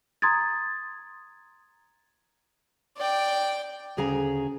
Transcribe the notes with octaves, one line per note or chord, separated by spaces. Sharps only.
A#5 C6 D#6 G#6 A6
D5 G5
D2 C#3 G#4 G#5 A#5